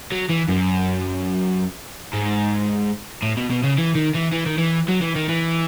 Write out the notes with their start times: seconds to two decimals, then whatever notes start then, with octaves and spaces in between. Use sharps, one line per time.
0.12 F#3
0.30 E3
0.48 F#2
2.13 G#2
3.23 A2
3.37 B2
3.50 B2
3.64 C#3
3.78 E3
3.96 D#3
4.15 E3
4.32 E3
4.46 D#3
4.58 E3
4.88 F#3
5.01 E3
5.15 D#3
5.29 E3